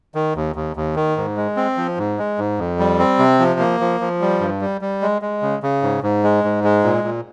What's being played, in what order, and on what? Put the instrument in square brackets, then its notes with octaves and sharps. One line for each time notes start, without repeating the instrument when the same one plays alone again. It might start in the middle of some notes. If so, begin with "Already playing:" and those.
[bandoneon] D#3
D#2
D#2
D#2
D#3
G#2
G#3
C4
F3
G#2
G#3
G#2
F2
G3
C4
C3
F3
A#3
F3
F3
G3
G2
G3
G3
G#3
G#3
C#3
C#3
G#2
G#2
G#3
G#2
G#3
A#2
A#2